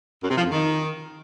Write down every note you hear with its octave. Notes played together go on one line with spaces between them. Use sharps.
F#2
C3
F3
F2
D#3